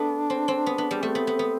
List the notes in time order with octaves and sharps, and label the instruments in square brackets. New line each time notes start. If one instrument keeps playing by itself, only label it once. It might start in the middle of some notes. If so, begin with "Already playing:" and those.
Already playing: [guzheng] A3 B3 [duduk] D4
[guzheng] C4
C4
B3
B3
G3
[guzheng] A3 [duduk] C4
[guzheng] B3
B3
B3